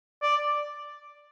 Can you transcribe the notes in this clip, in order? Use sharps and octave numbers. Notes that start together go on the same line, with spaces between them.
D5